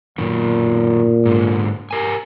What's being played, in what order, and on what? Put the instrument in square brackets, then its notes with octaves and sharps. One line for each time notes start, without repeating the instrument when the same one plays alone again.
[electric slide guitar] F#2 D#3 [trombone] A#2
[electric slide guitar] G#2 D3
G4 A#4 G#5